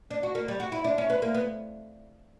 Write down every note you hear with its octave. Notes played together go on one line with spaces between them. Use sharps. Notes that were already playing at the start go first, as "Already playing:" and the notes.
D4
F#4
A#3
G3
F#4
E4
D4
C#4
B3
A#3
B3